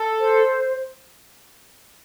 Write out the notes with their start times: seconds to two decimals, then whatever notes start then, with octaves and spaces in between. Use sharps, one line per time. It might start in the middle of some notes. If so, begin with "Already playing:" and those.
Already playing: A4
0.20 C5